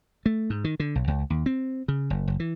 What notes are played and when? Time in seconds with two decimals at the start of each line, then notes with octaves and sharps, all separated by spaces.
0.26 A3
0.50 G#2
0.64 D#3
0.80 D3
0.95 B1
1.08 C#2
1.30 D#2
1.46 C4
1.88 C#3
2.10 F#1
2.28 F#1
2.40 E3